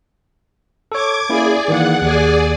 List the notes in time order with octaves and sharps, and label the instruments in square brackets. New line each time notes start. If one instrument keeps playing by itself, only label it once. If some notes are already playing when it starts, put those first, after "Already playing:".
[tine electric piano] A4 C#5 [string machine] D6 G#6
[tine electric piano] A#3 C#4 E4 [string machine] G#4 D5
[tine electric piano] D#3 E3 A#3 [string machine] F#5
[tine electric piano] D#2 [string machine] G#4 D5 G#5